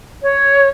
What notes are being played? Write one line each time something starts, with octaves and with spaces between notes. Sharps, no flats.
C#5